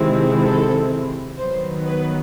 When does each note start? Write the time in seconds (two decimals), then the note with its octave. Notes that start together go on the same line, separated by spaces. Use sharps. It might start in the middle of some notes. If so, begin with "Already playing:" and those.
Already playing: C3 D#3 G#3 C4 E4
0.42 A4
1.39 D#3 F#3 B3 C5
1.87 B4